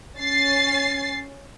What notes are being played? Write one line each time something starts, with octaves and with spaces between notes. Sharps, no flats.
C#4 A6 C7